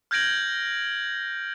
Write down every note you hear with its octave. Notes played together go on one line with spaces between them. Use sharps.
F6 G6 G#6 A#6 D7 F#7